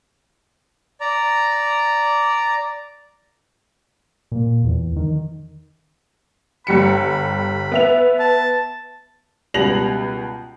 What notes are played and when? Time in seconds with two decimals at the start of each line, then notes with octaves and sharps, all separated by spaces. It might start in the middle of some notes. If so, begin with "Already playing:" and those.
1.01 D5 A#5
4.32 A#2
4.64 E2
4.96 D#3
6.67 G1 G3 B5 C#7
7.72 B3 E5 F7
8.20 A5
9.54 C#2 B2 G3 A#6 F7 F#7